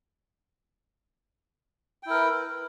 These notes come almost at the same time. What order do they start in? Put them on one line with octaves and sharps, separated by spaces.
G5 E4 A#4 B4